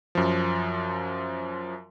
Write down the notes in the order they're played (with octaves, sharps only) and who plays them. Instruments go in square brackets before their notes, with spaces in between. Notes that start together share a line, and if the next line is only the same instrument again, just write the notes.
[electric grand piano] F#2 F3